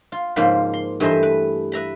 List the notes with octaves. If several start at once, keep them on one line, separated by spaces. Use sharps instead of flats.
F4
G#2 C#3 F3 A#3 C5 B5
C6
G2 E3 A3 C5 D#5 E5
B4
B4 E5 A#5 B5